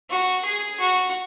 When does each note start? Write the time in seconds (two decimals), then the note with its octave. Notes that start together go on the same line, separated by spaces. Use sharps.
0.10 F#4
0.45 G#4
0.80 F#4